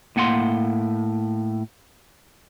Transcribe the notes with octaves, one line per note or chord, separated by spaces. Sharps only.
A2 A#3 F#5 G#5 C6